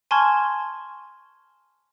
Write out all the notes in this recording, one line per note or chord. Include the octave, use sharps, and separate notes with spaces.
G#5 A5 C6 C#6 F6 G#6